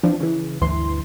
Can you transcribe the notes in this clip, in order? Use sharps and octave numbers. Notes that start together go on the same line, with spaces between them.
E3 F3 C4 D4
C#3 E3
G1 D2 E3 C6